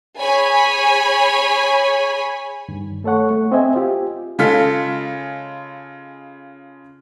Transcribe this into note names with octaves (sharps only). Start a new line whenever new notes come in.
G#4 C#5 G#5 B5
G2 D#3
A3 A4 C#5 F#5 C#6
A3
C4 C5 D#5 E5 G#5
F4 G4
C#3 G#3 F4 A4 F6 B6